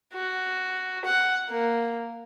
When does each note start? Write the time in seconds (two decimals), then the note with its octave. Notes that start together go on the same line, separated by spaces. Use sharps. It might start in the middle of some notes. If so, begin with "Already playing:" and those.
0.13 F#4
1.05 F#5
1.50 A#3